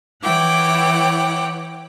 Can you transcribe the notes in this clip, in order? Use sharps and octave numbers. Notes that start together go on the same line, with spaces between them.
E3 E4 C#5 F#5 G5 D6